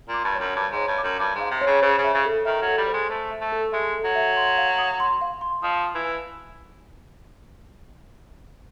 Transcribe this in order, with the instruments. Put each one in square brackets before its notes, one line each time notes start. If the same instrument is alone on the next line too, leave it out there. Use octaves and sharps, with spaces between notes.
[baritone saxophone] A#2
[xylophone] D6
[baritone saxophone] G2
[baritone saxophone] F#2 [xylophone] C#5
[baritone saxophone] G2 [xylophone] D6
[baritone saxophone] G#2 [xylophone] C#5
[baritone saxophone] G2
[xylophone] D6
[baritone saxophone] F#2
[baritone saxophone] G2 [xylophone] D6
[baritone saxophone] G#2
[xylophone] F5
[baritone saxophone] C3
[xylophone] C#5
[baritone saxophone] C#3
[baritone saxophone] C#3 [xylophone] C5
[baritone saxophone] C#3
[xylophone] E5
[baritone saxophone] C#3
[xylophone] A4
[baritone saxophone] D#3 [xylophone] E5
[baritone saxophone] F#3
[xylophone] A4
[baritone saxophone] G3
[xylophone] C5
[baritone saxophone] G#3
[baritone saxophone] A3 [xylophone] C5
[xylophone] E5
[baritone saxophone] A3
[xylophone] A4
[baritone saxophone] G#3 [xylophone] E5
[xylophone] A4
[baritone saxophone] F#3
[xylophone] E5
C6
F5
D#6
C6
F5
C6
[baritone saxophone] F3 [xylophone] D#6
[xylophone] D#6
[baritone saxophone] E3
[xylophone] G#5